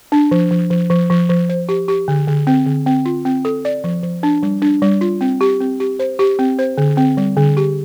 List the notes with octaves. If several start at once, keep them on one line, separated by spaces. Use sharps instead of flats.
D4
F3
F3
F3
F3
F3
F3
C5
G4
G4
D3
D3
C4
D3
C4
F4
C4
A4
D5
F3
F3
D4
G3
D4
G3
F4
C4
G4
C4
G4
C5
G4
C4
C5
D3
C4
G3
D3
G4